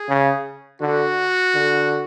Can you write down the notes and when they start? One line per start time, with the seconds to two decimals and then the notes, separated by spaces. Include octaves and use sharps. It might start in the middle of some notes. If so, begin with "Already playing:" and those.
Already playing: G#4
0.09 C#3
0.81 D3 F#4
1.55 D3